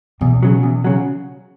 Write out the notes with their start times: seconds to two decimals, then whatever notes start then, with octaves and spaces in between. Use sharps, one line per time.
0.21 E2 B2
0.43 C#3 F#3
0.63 E2
0.84 C#3 F#3